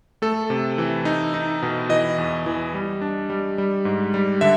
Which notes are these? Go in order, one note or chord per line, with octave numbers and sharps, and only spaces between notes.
A3 A4
C3
E3
D#4
D#4
B2
E3 D#5
E2
E3
G3
D4
G3
G3
G#2
G3
D3 E5